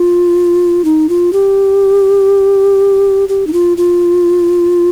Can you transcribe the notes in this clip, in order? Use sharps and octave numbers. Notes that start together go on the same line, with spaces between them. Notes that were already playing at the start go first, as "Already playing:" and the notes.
Already playing: F4
D#4
F4
G4
G4
D#4
F4
F4